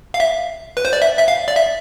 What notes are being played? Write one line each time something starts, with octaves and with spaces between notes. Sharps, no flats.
F5
E5
B4
C5
D5
E5
E5
F5
D5
E5